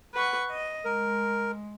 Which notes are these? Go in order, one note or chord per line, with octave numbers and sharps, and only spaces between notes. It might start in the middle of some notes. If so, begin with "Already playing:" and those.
B4 F#5 C#6
D#5
G#3 A#4